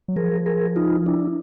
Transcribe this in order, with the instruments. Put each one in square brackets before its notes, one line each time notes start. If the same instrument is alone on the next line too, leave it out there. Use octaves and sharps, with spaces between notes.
[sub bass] F#3
[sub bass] F3 [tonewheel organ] G#4 A#4
[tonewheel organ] G#4 A#4
D#4 F4
D4 E4